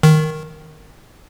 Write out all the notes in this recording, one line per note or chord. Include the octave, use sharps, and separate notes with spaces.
D#3